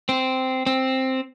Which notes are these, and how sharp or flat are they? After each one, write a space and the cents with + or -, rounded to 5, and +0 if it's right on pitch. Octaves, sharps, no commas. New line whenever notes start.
C4 -10
C4 +5